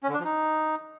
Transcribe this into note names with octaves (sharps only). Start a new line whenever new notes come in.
C#4
D3
D4
F3
D#4